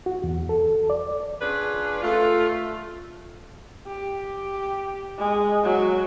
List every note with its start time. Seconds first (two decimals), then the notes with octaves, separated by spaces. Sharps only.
0.06 F#4
0.24 E2
0.49 A4
0.90 D5
1.41 C#4 D4 F4 G#4 B4
2.02 A3 F4
3.87 G4
5.18 G#3
5.64 F#3